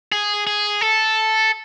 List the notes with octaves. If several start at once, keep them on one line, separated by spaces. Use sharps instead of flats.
G#4
G#4
A4